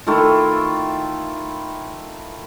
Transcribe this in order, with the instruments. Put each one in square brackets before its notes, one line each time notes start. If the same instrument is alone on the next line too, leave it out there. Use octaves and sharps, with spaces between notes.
[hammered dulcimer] D#3 A3 E4 F4